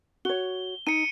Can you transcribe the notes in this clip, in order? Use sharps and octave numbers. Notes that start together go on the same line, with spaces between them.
F#4 C#5 G7
D#4 A#5 C#7 D#7